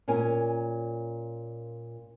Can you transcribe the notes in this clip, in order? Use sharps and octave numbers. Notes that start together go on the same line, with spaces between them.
A#2 C#4 A#4 G#5